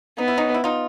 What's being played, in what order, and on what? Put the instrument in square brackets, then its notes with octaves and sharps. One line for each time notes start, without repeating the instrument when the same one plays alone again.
[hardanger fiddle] B3 [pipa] D#4
[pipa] E4
C#4 D#4
E4
D#4 F4